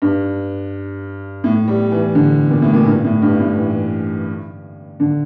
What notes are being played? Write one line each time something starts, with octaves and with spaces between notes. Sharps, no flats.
G2
A2
G3
E3
D3
A#2
A2
A#2
G2
A2
G2
A2
E3
D3